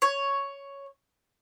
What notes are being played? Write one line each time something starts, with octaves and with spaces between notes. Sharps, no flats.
C#5